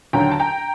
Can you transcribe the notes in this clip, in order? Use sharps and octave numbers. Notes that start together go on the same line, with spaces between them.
D#2 D3 F#3 G5 A#5
A5
G5 A#5